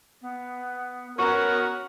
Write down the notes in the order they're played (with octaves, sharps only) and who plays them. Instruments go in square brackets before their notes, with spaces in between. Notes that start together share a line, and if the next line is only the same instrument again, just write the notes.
[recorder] B3
[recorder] B3 [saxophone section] C#4 F#4 [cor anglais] A#4 [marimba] C#6